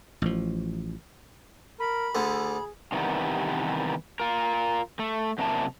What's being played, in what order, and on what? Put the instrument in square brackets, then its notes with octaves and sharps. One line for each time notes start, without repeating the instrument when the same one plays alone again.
[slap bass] A1 F3
[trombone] A#4 [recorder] B5
[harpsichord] D2 D3 [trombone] G#4
[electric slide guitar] C3 D#3 E3 G3 B3
F4 A#4
A3
F#2 C3 A#3 D4 E4 A5